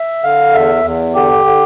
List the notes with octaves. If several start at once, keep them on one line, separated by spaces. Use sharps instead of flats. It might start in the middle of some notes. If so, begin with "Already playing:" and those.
Already playing: E5
D3 F5
E2 E5
E2
D3 G4
D3